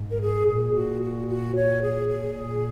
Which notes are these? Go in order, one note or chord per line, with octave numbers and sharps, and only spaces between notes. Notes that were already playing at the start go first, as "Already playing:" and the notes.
Already playing: G#2
A#4
G#4
A#2 G#4
F#4
F#4
F#4
C#5
G#4
A#2 G#4